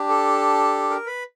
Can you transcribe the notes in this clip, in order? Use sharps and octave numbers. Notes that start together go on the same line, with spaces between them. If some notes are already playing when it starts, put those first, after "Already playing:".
Already playing: D4 G4
A4
A#4
B4